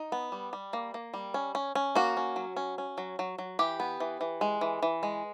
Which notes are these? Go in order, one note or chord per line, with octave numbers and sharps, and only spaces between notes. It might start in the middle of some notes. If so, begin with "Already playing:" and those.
Already playing: D#4
B3
G3
G3
A#3
A#3
G3
C#4
C#4
C#4
A#3 F#4
C#4
F#3
C#4
C#4
F#3
F#3
F#3
E3 G4
B3
E3
E3
G#3
E3
E3
G#3